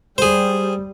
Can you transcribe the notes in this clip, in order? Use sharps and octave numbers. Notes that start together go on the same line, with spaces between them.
G3 G#4 C5